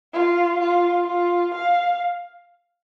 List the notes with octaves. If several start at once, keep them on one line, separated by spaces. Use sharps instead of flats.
F4
F4
F4
F5